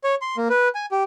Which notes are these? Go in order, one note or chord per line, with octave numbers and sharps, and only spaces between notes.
C#5
C6
A#3
B4
G#5
G4